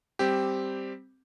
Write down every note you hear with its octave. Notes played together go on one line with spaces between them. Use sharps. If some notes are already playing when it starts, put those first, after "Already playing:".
G3 C4 G4